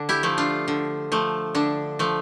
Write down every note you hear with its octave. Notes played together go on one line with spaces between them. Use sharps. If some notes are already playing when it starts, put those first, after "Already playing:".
Already playing: D3 D4
E4 G4
F3 A3
D4 F4
D3
F3 A3
D3 D4
F3 A3